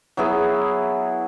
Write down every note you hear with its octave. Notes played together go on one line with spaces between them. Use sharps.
F#3 B3 E4 G#4